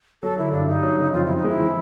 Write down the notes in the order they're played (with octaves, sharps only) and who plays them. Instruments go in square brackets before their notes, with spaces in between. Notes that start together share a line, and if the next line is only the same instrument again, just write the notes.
[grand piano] F#3 [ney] A4
[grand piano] D3 [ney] E4
[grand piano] G2 [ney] D4
[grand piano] G2 [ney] D#4
[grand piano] F#3
C#3
[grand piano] F2 [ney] F4
[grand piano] F2 [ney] E4
[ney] D#4
[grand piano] G#3 [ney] E4
[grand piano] E3